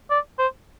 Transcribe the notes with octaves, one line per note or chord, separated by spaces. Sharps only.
D5
C5